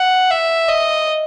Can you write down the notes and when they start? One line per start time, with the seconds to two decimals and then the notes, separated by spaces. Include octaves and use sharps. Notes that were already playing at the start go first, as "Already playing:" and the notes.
Already playing: F#5
0.31 E5
0.69 D#5